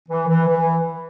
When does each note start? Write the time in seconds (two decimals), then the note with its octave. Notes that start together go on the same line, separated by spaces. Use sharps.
0.09 E3
0.27 E3
0.47 E3